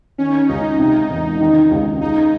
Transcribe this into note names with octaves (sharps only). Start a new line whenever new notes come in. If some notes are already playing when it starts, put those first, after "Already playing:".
D#3 C#4
C#2 D#4
C3
E1
D#3
C#2
G#3 D#4